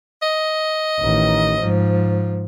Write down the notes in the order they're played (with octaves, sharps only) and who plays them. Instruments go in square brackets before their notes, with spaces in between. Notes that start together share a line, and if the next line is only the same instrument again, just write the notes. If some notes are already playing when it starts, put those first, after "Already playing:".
[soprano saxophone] D#5
[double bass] A1 D#3
G#2 F3